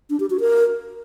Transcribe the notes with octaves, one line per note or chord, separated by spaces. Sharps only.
D4
G4
F#4
A#4